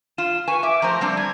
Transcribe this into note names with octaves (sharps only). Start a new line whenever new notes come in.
F4 E7
B4 G#5 C#6
E5 D6
F3 A3 C5 A#5
G3 C4 D4
G3 G#6